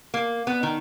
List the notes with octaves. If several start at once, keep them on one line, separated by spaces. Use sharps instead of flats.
A#3
B3
D#3